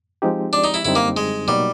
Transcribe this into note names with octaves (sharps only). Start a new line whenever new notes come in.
F3 G#3 C4 D#4 G4
D4
D#4
E4
F#2 D3 G3 C4 D#4 E4
A#3
G#3
B2 F#3 G3 A#3 D#4 F#4